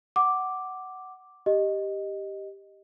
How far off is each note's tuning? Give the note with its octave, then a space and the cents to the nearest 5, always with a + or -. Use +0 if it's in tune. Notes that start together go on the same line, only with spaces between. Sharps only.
F#5 +10 D6 +0
G4 +0 D#5 +0